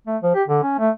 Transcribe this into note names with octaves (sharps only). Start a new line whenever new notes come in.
A3
F3
G4
D3
C#4
A3